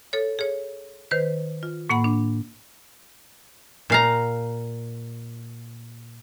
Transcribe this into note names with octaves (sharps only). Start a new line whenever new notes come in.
A4 C#5
G#4 C#5
D#3 B4 C5
F4
A2 A#3 F#5 B5
D4
A#2 F5 A#5